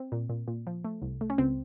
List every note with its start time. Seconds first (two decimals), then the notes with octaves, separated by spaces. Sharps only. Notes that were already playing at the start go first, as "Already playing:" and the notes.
Already playing: C4
0.12 A#2
0.29 A#2
0.48 A#2
0.67 F3
0.84 A3
1.02 C2
1.21 A3
1.30 C#4
1.38 C#2 C4